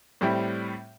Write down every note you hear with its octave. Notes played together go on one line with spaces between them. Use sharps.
A2 G3 C4 E4 G4